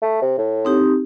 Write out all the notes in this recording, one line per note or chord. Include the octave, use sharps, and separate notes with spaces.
A3
C3
A2
C4 D#4 G4